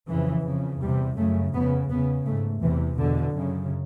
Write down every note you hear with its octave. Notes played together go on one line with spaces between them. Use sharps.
F2 C#3 E3
F2 C#3
E2 C3 G3
F#2 C#3 A3
F2 C#3 B3
E2 C#3 B3
G#2 A3
E2 C3 E3
E2 B2 D3
F#2 C#3